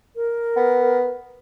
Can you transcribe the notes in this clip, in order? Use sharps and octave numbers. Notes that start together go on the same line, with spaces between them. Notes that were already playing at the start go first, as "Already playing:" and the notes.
A#4
B3